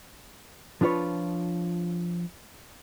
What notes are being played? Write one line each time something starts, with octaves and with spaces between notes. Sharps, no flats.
F3 D4 F4 B4 C#5